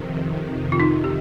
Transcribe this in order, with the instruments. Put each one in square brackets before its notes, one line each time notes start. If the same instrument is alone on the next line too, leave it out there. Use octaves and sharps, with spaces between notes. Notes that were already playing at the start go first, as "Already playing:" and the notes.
Already playing: [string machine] F2 C3 D#3
[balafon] F4
D#4
G4